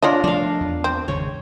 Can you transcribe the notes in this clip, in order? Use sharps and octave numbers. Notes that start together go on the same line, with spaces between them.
D4 F4 A#4 C#5 D#5
F3 F#3 A3 D4 F5
E2
C4
G#1 C#3 G#3 C#5